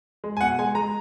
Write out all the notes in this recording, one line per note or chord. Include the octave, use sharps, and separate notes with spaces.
G#3
G#5
B2 F#5
G#3 G#5
G#3 A#5